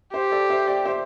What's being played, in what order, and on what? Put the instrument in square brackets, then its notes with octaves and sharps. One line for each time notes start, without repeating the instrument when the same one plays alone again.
[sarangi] G4 [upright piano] C5
[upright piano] A4 D5
C5 E5
D5 G5
C5 E5